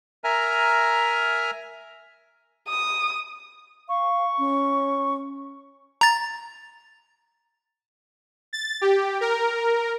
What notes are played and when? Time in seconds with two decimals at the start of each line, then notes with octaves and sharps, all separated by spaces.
0.24 A#4 E5 G#5 A#5 F6
2.69 D#6
3.89 F5 C#6
4.38 C#4
6.01 A#5 A6
8.53 A6
8.81 G4
9.21 A#4